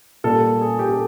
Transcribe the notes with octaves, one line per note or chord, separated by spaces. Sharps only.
A#2 G3 A4
G#4
G4
A4